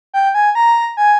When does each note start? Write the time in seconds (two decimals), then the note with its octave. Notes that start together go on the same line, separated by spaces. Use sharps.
0.14 G5
0.35 G#5
0.55 A#5
0.97 G#5